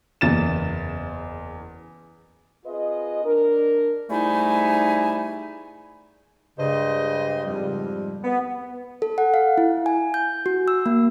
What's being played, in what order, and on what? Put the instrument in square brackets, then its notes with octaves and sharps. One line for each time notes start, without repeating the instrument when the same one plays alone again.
[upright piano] F#1 E2 A6 E7
[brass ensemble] C4 F4 G#4 B4 D#5
D4 A#4
[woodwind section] G#2 G3 A3 D#4 E4 G#5
[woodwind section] G2 C#3 [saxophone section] G#3 C5 D#5
[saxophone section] F2 G#2 G3
[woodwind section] B3
[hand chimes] A4
F#5
F5
E4
G#5
G6
F#4
E6
A#3